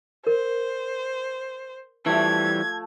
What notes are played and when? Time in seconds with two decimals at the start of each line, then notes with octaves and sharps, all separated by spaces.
0.27 A#4 C5
2.06 E3 F3 G3 A3 G#6